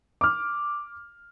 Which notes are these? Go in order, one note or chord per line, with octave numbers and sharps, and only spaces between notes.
D6 F6